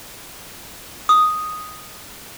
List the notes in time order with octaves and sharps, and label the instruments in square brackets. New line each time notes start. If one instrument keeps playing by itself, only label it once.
[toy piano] D#6